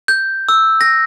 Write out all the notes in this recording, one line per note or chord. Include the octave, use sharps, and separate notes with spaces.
G6
E6
A#6